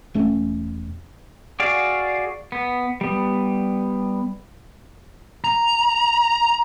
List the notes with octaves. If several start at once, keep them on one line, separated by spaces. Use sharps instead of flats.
E1 A3 C#4
F#4 G#4 D5 F5
B3
G3 B3
A#5